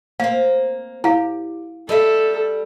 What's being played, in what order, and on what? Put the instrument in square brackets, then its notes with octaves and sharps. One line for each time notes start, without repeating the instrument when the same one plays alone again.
[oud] A#3 C4 [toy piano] F5
[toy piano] E4 F5 [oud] G4
[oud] G3 D#5 E5 [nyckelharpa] A4